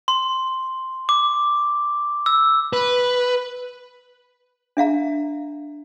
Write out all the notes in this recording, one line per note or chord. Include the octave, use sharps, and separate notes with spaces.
C6
D6
E6
B4
D4 E5 F5 A#5